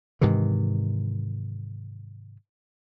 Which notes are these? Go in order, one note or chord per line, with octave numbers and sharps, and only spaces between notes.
G#2 C3 D#3 E3